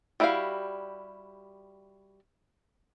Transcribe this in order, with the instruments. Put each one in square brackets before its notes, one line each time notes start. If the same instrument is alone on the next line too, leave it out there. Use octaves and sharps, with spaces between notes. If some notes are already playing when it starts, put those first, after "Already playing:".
[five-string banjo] G3 E4 F#4 G4 F5